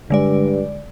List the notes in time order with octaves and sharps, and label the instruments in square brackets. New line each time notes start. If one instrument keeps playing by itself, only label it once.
[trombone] G2 [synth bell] D3 G#3 D5